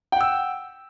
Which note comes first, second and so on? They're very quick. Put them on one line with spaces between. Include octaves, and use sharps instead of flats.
G5 F#5 E6